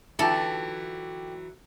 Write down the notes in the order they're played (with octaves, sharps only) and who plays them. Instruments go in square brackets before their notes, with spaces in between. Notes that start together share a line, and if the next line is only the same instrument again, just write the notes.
[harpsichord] D3 G4 [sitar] E3 F#3 [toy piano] D#4 F4 E5 [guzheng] A4